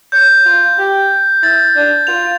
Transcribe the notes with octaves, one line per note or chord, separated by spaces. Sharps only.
C#5 G6
F4
G4
E4 A6
D4
F4 F7